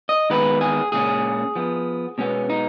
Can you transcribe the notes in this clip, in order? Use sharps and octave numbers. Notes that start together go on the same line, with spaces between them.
D#5
D#3 G#3 B3 B4
G#4
A#2 G#3 C#4 G#4
F3 B3
B2 G#3 B3 C#4
D#4